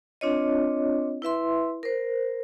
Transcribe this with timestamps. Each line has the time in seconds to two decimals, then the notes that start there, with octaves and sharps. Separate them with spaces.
0.21 C4 D4 F4 C#5 D#5
1.22 E4 B4 E5 C6
1.83 A#4 C5